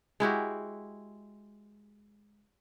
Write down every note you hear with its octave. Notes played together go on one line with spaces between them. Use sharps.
G#3 E4 F#4 G4